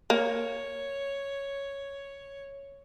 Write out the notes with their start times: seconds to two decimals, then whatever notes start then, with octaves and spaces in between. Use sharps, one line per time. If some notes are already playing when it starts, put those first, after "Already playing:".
0.10 A#3 C#5